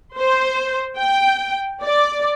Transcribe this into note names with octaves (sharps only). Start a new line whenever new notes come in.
C5
G5
D5